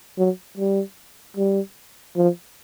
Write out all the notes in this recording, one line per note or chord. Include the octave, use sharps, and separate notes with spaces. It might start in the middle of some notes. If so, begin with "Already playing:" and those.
F#3
G3
G3
F3